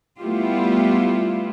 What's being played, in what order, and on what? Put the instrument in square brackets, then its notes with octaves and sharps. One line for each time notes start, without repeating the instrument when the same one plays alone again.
[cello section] G3 A3 B3 E4 F4 G4